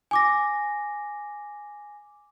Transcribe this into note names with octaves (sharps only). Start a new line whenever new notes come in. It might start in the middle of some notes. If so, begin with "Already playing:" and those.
G#5 D6 A#6